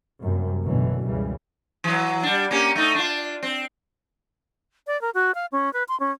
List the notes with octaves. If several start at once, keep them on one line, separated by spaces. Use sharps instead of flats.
F#2 C3 G3 A#3
A1 F#2 B2 D3 E3 F#3
C#2 F#2 C#3 E3 G3
E3 F#3
G3 D4
A#3 C#4 G4
A3 D#4
D4 F4
C4
D5
A#4
F#4
F5
C#4
B4
C6
C#4